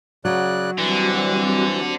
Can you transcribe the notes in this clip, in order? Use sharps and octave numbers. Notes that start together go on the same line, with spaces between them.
C#3 F#3 D5 F#6
D3 E3 G3 C4 F#4